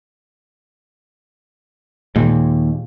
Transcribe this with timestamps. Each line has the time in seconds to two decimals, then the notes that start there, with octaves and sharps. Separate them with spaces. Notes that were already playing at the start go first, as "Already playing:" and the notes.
2.16 D#2 A#2 G#3